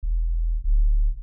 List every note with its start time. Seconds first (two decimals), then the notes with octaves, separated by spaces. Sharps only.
0.03 E1
0.64 D1